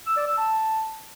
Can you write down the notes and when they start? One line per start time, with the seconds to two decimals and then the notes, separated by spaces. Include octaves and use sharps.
0.06 E6
0.17 D5
0.27 E6
0.37 A5